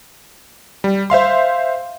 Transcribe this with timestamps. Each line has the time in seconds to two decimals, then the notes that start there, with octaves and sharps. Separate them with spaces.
0.84 G3
1.10 C5 E5 F5 C6